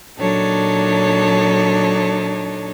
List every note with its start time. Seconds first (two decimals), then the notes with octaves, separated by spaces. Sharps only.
0.18 A#2 F#3 D4 D#4 A4 C#5